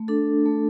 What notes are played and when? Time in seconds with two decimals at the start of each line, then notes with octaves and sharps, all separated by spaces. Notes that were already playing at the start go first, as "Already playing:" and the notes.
Already playing: A3
0.08 D4 A4
0.46 A3